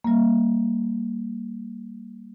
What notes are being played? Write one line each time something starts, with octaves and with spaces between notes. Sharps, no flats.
G3 A#3